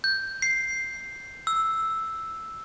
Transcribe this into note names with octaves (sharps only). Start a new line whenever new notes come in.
G6
C7
E6